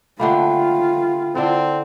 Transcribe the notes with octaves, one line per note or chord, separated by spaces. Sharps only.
D3 A3 A#3 F4 F#5 G5 B5
D3 C4 E4 A4 D5